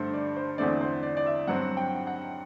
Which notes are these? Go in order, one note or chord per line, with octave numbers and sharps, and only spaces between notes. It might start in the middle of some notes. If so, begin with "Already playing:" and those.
Already playing: G2 D3 A3 A4 C5
D5
C5
E2 D3 A3 C4 D5
C5
D5
D5
E5
G2 F#3 C4 F#5
G5
F#5